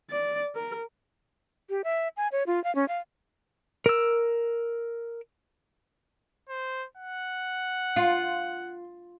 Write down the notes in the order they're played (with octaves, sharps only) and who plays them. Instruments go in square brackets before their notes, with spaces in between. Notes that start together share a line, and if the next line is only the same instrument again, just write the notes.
[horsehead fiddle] D5
A#4
[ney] G4
E5
G#5
C#5
F4
F5
C#4
F5
[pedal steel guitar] A#4 E6
[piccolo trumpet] C5
F#5
[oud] F4